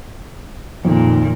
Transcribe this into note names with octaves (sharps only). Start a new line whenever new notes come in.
F2 A#2 D#3